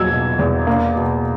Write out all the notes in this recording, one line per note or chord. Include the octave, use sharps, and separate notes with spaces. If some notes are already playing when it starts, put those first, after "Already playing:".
Already playing: E2 B2 F#3 A#3 E6 G#6
B2
E2
A#3
B2